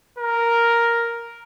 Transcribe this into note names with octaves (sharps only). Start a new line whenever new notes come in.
A#4